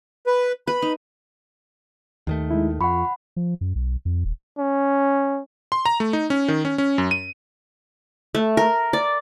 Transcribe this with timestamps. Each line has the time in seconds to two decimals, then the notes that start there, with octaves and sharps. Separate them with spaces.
0.26 B4
0.67 B4 B5
0.82 D#4
2.27 D#2 D#3 A3
2.51 G#3 D#4 E4
2.81 F2 F4 F#5 B5 C#6
3.36 F3
3.61 F#2
3.75 B1
4.05 F2
4.25 D#1
4.58 C#4
5.72 C6
5.86 A#5
6.00 A3
6.13 D#4
6.30 C#4
6.48 D#3
6.65 C#4
6.78 C#4
6.98 F#2
7.11 D#7
8.35 A3
8.57 A#4
8.93 D5